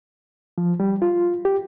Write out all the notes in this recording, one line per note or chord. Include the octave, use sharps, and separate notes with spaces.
F3
G3
F4
G4